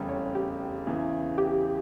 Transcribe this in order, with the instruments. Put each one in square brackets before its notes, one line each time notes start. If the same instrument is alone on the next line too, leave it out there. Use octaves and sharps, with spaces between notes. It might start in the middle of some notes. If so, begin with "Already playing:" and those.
Already playing: [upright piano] F1 E2 C#3 G3
[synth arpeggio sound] C#5
G4
[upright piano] E2 C#3 E3
[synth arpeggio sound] G4